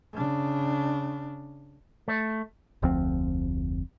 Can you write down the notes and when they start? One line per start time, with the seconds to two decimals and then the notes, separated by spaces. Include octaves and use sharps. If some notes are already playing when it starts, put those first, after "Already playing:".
0.13 C#3 D4
2.08 A3
2.82 F1 D2 F3 C4